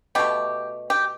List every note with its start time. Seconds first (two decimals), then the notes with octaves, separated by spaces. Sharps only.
0.15 B2 A3 G4
0.90 G4